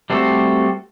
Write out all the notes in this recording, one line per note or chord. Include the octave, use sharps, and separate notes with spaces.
G3 A3 C4 F#4 A4